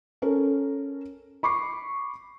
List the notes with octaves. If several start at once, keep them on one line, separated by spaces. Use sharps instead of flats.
C#4 A4 A#4
B5 C#6 D6 C7